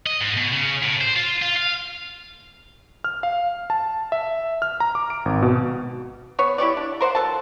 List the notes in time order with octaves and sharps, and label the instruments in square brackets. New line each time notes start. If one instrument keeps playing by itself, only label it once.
[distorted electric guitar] D#5
G#2
B2
C#3
A2
C5
F4
F4
F5
[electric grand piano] F6
F5
A5
E5
F6
A#5
D6
D7
G#1
B2
[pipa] B3 C#5
E4 G4 C#5 D5
D4
A#4 C5 D5 F#5
F#3 A4 A5